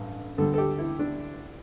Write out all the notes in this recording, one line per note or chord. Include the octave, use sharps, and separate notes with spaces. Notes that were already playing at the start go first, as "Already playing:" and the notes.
Already playing: A1 G2
D2 D3 G3 A4
A4
G4
E4
D4